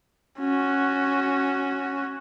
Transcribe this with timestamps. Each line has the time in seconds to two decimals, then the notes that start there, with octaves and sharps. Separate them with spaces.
0.39 C#4 F#4